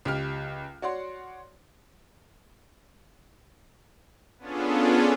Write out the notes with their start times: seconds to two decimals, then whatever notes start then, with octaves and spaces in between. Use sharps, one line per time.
0.05 C#2 G4 G5 F6
0.82 F#4 C#5 D5 F#5 C6
4.38 B3 C#4 D4 F4 G#4 A4